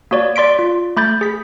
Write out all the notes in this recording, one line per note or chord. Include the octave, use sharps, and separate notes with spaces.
A#3 F#4 C#5 D5
D5 C6 B6 D7
F4
A3 B5 G6 A6
G#4 B6